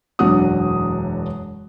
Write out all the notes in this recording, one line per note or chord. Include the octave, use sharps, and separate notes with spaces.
E1 F#2 D4 F#4 F#5 D#6